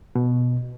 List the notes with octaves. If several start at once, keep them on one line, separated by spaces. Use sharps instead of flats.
B2